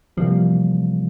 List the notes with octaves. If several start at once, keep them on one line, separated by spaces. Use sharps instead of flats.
C3 E3 F3 G3 A#3